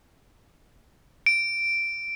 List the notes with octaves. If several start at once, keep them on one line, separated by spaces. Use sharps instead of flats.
D7